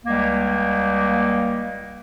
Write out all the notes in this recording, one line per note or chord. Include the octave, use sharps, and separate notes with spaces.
C#2 G3 A#3